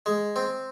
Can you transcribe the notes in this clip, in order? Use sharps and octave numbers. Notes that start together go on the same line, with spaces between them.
G#3
C4